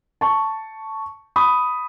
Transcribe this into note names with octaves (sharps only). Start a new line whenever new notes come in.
A5 C#6
B5 D#6